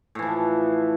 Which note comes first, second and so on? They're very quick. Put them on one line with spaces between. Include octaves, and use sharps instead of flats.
A2 E3 F3